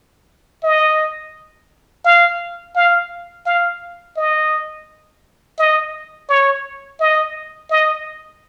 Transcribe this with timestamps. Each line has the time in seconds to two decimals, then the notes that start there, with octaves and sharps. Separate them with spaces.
0.63 D#5
2.05 F5
2.76 F5
3.46 F5
4.17 D#5
5.58 D#5
6.29 C#5
7.00 D#5
7.70 D#5